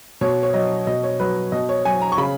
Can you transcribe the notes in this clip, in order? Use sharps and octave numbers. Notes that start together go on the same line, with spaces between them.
B2 C#5
C#5
F#3 D#5
B2 D#5
C#5
F#3 B4
B2 D#5
C#5
F#3 G#5
A#5
C#6
C#3 B5